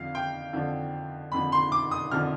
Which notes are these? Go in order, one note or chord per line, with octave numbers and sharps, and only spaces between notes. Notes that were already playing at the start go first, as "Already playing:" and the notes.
Already playing: F2 D3 F3 F5
G5
F2 D3 F3
F2 D3 F3 B5
C6
D6
D#6
F2 D3 F3 F6